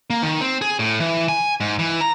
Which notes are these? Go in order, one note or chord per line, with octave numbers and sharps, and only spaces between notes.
A#3
D#3
C4
G#4
A2
E3
G#5
G#2
E3
A#5